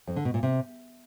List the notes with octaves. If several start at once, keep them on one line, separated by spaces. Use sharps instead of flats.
F2
D3
B2
A#2
C3